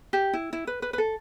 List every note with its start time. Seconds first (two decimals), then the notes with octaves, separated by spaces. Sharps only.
0.13 G4
0.33 E4
0.53 E4
0.67 B4
0.82 B4
0.93 B4
0.98 A4